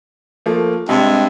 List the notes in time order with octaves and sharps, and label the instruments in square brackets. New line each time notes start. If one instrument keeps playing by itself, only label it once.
[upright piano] F3 A3 A#3
[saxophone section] G2 G#3 [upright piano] C3